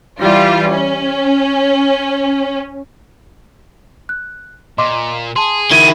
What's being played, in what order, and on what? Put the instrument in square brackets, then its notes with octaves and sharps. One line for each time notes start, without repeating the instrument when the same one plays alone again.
[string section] E3 G3 F4
C#4
[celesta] F#6
[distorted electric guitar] A#2 [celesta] D#5 C6 D6
[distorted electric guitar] G#4 [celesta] A5 C6
[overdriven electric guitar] D#3 E4 [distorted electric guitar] F#4 G#4 [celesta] G#6 [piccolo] D#7